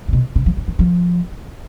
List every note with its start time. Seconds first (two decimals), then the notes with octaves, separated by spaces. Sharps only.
0.08 C3
0.13 B2
0.36 C#3
0.46 F3
0.57 E3
0.68 E3
0.79 F3